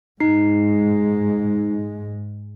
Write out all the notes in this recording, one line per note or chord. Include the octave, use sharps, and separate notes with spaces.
G#2 G#3 D#4 C7